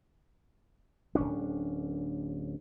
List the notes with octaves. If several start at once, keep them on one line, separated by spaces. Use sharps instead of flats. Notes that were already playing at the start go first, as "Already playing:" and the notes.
D1 G#1 C#4 D4